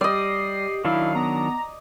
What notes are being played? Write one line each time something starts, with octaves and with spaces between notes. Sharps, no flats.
G3 G4 D5 D#5 C7
D#3 F#3 D4 E4 F5
B3 A#5